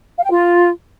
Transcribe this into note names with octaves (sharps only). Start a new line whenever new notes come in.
F5
G5
F4